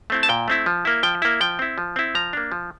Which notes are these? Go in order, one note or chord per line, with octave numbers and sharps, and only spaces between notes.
A3 C4 E4
A5
A#2 G5
A3 C4 E4
F3
A#3 E4
F3 G5
A#3 E4
F3 G5
C4 E4
F3
C4 E4
F3 A#5
A#3 D4
F3